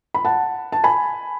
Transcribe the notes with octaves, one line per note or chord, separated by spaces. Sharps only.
B5
F#5 A5
A5
G#5 B5